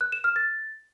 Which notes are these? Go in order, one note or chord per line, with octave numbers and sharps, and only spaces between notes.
F#6
E7
F6
A6